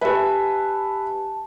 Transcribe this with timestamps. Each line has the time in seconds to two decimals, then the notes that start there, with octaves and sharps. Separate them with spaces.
0.01 G4 B4 E5 G#5 A5